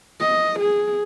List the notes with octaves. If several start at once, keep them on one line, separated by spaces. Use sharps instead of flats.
D#5
G#4